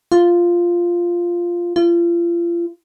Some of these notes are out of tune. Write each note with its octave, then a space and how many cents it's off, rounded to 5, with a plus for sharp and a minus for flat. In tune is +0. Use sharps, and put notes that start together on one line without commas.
F4 -5
F4 -35